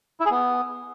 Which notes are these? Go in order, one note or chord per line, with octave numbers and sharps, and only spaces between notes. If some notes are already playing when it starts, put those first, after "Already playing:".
E4
G#4
B3